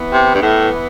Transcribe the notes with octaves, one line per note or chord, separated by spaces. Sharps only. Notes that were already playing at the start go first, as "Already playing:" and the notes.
Already playing: E3 B3 E4
C3
G2
A2